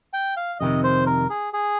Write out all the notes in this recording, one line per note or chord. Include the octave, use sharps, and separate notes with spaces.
G5
F5
F2 C3 D#3 D#5
C5
A#4
G#4
G#4